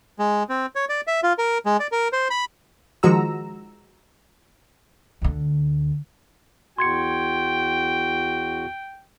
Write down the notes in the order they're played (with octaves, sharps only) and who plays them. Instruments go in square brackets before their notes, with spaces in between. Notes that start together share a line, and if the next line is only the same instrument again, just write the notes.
[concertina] G#3
C4
C#5
D5
E5
F4
A#4
G#3
D5
A#4
C5
B5
[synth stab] D#3 F3 G#3 F#4 A#5 E6
[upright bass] D2 D3
[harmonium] E2 F#4 [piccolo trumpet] G5 [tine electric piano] C6 G#6 C#7